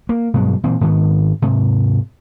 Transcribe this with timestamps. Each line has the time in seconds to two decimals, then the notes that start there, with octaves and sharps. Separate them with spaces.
0.09 A#3
0.34 G2 B2 F#3 G#3
0.64 A#2 E3 C4
0.81 G#2 D#3 B3
1.42 G#2 C3